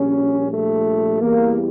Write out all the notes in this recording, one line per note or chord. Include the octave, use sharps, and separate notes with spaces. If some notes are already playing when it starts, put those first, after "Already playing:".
Already playing: A#1 A#2 G3 C#4
A3
E2 E3 G3 A#3